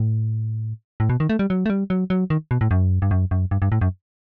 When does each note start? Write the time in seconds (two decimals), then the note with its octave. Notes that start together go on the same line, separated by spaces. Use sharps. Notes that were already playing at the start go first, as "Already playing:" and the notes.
Already playing: A2
1.00 A2
1.10 B2
1.20 D#3
1.29 A3
1.39 G3
1.50 F#3
1.66 A3
1.70 G3
1.90 F#3
2.10 F#3
2.30 D#3
2.51 B2
2.61 A2
2.71 F#2
3.02 G2
3.11 F#2
3.31 F#2
3.51 G2
3.62 G2
3.72 A2
3.81 F#2